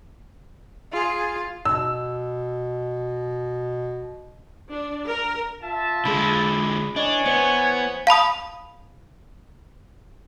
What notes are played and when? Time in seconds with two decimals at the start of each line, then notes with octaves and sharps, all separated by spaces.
0.93 F4 G#4
1.65 B2 E6
4.70 D4
5.06 A#4
5.63 F4 E5 A5
6.05 D3 G#3 G#4 B5
6.96 E3 D4 C#5 D#5 G#5
7.26 B3 C5
8.07 F5 A5 B5 D#6